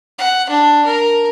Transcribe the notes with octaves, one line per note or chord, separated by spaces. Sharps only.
F#5
D4
A#4